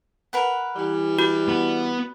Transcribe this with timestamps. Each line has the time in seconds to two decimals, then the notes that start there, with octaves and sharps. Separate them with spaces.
0.33 A#4 B4 F#5
0.76 E3 G3
1.19 F#4 B4 D5
1.49 B3 B5